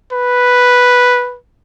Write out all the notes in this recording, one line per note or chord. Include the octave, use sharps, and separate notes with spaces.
B4